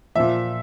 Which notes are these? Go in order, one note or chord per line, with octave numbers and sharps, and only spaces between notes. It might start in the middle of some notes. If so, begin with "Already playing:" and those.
A#2 F3 E5